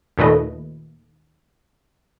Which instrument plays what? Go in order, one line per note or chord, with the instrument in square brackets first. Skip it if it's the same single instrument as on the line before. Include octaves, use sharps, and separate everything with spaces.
[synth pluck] D#2 A#2 A3 B4 D#5